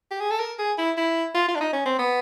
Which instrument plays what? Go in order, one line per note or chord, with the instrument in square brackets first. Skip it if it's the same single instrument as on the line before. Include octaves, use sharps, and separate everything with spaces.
[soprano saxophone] G4
G#4
A4
A#4
G#4
E4
E4
F4
F4
D4
D#4
C#4
C4
B3